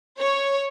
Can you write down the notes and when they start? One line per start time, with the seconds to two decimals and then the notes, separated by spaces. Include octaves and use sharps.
0.19 C#5